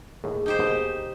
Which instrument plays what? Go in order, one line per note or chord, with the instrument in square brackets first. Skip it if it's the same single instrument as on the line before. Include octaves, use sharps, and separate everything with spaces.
[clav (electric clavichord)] D#2 A2 [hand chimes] G#4
[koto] D#4 G4 C5
[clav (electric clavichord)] D#2 G#2 B2